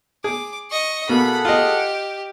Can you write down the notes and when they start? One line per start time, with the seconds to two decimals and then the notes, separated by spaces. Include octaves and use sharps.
0.24 G#4 D6
0.71 D#5 C#6
1.09 B2 A#3 G#4 A4 F#5 B5
1.45 F4 G4 D#5